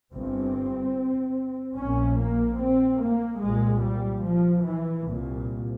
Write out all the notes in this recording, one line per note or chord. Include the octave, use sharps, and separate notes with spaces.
G1 G2 C4
A#1 A#2 C#4
A#3
C4
A#3
C2 A#2 G#3
G3
F3
E3
C2 A#2